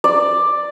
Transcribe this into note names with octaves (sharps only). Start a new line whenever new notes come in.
D5